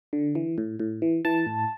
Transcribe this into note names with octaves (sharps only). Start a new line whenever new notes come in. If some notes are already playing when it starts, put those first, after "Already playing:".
D3
E3
A2
A2
E3
E3 A5
A2